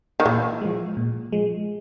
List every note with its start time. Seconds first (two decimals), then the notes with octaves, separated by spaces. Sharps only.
0.20 D#3
0.26 A#2 E3
0.61 F3 G#3
0.97 A#2
1.32 F3 G#3